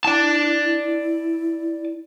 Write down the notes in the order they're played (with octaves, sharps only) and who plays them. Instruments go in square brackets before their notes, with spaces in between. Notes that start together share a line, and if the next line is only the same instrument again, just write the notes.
[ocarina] E4 [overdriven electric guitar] D5 A5